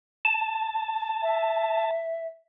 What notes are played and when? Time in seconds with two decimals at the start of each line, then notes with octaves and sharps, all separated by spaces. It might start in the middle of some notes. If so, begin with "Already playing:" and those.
0.25 A5
1.22 E5